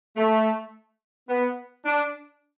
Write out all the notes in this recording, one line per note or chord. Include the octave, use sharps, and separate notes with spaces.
A3
B3
D4